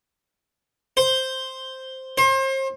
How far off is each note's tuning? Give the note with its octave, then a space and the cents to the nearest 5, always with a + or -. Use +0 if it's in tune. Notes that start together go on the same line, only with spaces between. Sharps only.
C5 +0
C5 +35